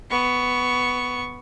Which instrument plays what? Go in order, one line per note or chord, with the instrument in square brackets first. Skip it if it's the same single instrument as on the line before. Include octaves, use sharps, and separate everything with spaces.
[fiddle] B3 C#6